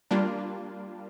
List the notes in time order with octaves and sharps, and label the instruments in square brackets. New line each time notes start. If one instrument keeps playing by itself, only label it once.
[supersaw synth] G3 A#3 D4 F4